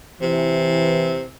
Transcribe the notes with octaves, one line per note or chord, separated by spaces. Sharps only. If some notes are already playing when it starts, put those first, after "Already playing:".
C3 E3